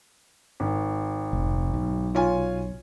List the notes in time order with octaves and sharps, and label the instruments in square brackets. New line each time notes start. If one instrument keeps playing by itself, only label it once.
[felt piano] G#1
[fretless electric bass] F1
B1
[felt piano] F4 C#5 G#5